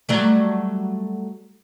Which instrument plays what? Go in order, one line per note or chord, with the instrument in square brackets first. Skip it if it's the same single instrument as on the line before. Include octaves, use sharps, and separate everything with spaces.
[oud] F#3 G3 A3